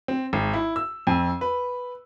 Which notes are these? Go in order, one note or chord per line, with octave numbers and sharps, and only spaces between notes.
C4
G#1
E4
E6
F2
B4